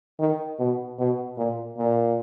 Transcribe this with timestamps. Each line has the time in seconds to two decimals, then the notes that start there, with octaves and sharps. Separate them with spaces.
0.19 D#3
0.59 B2
0.99 B2
1.38 A#2
1.78 A#2